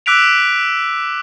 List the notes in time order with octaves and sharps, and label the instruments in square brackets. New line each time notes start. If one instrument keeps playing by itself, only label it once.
[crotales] D6 E6 F#6 B6 D7 F7